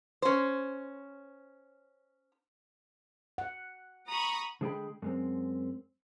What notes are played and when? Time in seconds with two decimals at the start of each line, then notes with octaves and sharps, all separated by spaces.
0.22 C#4 C5
3.38 F#5
4.08 A#5 B5 C#6 D#6
4.61 D3 G#3 G#4 D5 G5 B5
5.02 F#2 G#3 C4